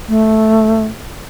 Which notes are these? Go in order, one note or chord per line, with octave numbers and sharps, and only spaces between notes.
A3